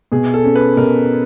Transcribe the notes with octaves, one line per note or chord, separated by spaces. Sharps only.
B2 G#4
A4
C#4
B4
B2 A#4